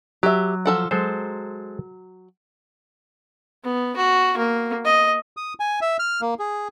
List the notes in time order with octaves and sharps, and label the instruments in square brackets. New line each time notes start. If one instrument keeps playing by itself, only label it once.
[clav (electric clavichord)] F#3 [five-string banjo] G4 E5
[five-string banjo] F3 A4 F#5
[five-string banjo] F#3 [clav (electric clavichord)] G#3 A4 C5
[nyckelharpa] B3
F#4
A#3
D#5
[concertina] D#6
G#5
E5
F6
A#3
G#4